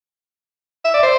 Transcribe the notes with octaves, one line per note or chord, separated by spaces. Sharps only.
E5
D5
C5